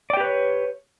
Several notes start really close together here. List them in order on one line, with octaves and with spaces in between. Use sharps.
D5 G5 G4 B4 C#5